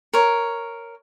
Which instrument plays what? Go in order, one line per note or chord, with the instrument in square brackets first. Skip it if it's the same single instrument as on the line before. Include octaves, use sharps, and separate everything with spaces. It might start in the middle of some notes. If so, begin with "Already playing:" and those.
[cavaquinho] A#4 C#5